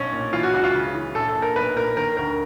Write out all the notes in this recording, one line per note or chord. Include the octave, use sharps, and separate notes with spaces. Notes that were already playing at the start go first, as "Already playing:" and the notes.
Already playing: B1 C#4
A#2
E3 F4
F#4
C#2 F#4
F4
C#3
E3
A#1 A4
A4
A#2
A#4
B1 B4
A#2 A#4
D#3 A#4
D2 A#4